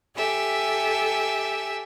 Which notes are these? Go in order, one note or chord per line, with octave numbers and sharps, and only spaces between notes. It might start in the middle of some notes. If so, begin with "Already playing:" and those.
G4 A4 E5 G#5